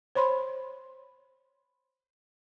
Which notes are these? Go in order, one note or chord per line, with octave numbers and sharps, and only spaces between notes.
C5 C#5 B5 C6